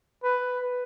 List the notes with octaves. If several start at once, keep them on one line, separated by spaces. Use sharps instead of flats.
B4